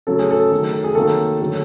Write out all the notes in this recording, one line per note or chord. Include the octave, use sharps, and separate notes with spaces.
C#3 F#3 A3 A4
G#4
A4
D#3 F#3 A3
G#4
C3 D#3 F#3 A#3 A4
D3 F#3 A3